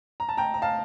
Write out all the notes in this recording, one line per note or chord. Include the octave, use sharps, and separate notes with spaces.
A#5
A5
G5 A#5
A#5
F5 A5